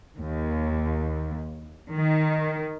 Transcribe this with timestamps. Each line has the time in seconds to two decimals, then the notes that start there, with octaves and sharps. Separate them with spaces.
0.19 D#2
1.92 D#3